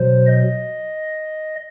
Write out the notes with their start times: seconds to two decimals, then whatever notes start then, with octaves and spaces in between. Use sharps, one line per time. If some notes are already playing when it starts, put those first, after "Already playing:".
Already playing: B2 F#3 C5
0.27 D#5